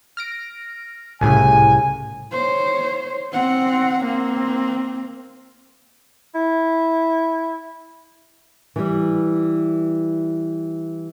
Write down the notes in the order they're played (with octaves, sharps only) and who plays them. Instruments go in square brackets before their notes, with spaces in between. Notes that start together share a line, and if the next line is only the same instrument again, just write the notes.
[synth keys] F6 A#6 D7
[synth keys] C2 A2 C#3 [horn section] G#5
[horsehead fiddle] C5 C#5
C4 F#5
A#3 C4
[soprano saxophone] E4
[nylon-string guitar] E3 G3